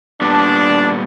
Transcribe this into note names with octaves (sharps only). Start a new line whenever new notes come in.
A#2 G3 B3 D4